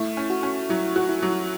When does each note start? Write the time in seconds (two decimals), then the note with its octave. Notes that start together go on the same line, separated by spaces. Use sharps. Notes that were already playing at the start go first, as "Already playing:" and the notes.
Already playing: A3 E4
0.17 C#4
0.30 F#4
0.43 C#4
0.69 F#3 E4
0.96 F#4
1.09 E4
1.22 F#3